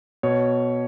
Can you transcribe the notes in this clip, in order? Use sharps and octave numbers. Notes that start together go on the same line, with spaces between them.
B2 C#5